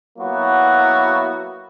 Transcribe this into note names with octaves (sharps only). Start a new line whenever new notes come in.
F#3 A#3 B3 E4 F#4